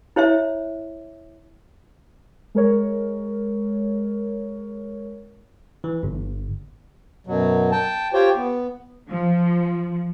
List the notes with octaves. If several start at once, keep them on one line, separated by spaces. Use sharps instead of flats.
E4 C5 C#5 E5
G#3 A#4 C#5
E3
G1
F#2 B2 F#3
G5 A5
F4 G4 C5 C#5 G5
B3
F3